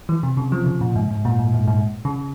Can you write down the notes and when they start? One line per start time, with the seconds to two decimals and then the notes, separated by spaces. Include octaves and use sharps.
0.09 E3
0.23 C3
0.37 C#3
0.52 F3
0.66 C#3
0.81 A#2
0.96 G#2
1.11 G#2
1.25 A#2
1.39 G#2
1.54 G#2
1.68 G#2
2.05 C#3